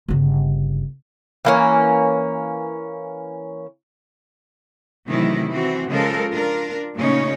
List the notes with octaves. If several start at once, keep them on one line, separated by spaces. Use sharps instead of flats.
G1 C#3
E3 A#3 C#4
C3 D#3 E3 F#3 A3 E4
E3 C4 F#4
C#3 F3 G#3 A4 A#4
D4 F4 A#4
A#2 C#3 A3 C#4 D#4 C#5